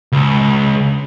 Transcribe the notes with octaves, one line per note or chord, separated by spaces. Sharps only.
C#2